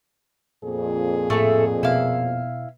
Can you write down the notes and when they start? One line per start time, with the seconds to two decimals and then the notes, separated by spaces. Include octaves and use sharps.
0.64 F2 A#2 G#4
1.30 A2 A3 A4
1.83 B2 B3 E4 F5